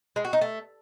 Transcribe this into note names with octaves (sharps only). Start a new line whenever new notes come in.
G#3
F#4
D#4
A3